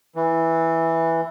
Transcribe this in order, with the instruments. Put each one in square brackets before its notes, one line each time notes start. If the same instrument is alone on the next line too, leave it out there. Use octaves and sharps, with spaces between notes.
[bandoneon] E3